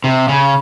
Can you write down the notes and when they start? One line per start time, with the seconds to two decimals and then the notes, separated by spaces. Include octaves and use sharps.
0.04 C3
0.29 C#3